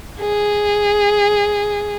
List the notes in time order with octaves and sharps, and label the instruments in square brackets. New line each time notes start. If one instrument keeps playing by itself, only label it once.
[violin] G#4